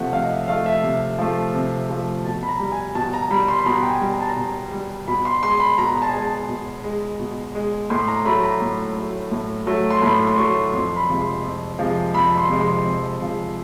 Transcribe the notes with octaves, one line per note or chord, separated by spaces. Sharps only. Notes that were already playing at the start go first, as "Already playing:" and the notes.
Already playing: C3 F3 A3 E5 F#5
C3 F5
D#5
E5
F3 A3 F5
E5
C3
F3 A3
C3
F3 A3
B2 A5
B5
A#5
G3
G#5
B2 A5
A#5
G3 B5
C6
B5
B2 A#5
G5
G#5
G3
A#5
A5
A#5
B2
G3
B2 B5
C6
G#3 C6
B5
B2 A#5
A5
G#5
G#3 A5
A5
B2
G#3
B2
G#3
A2 C6
A#5
F#3 A3 B5
A#5
A2
F#3 A3
A2
F#3 A3
C6
A2 B5
C6
F#3 A3 C#6
F2 C6
B5
C3 F3 G#3
C6
F2
C3 F3 G#3
F2 B5
C6
C3 F3 G#3
C6
F2
C3 F3 G#3